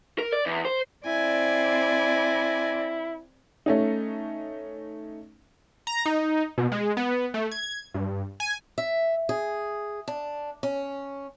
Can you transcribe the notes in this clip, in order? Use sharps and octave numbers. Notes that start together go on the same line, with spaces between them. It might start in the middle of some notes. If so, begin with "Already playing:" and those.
A#4
D5
E2
C5
C4 E4 D5 G#5
A3 C#4 D#4
A#5
D#4
B2
G#3
B3
A3
G#6
G2
G#5
E5
G#4
D4
C#4